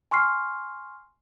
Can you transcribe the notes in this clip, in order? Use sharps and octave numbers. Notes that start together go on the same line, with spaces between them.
G#5 C6 C#6 F6 C7